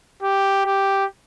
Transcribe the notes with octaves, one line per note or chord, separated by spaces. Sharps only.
G4
G4